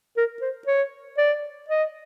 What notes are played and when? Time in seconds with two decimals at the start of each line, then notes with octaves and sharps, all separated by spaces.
0.17 A#4
0.41 C5
0.67 C#5
1.18 D5
1.69 D#5